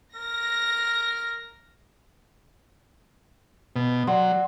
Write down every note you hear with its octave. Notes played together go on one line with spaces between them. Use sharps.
A#4 A#6
B2
F#3 D5 F#5 C6